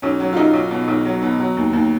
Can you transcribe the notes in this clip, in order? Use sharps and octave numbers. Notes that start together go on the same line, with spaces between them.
B1 C#4
F#3
F4
B1 D#4
B1
B2
B1
F#3
B2
F#3
D#2
D#2